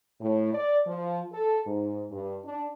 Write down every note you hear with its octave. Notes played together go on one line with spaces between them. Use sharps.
A2
D5
F3
A4
G#2
G2
D4